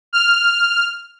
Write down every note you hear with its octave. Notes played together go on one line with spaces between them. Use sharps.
F6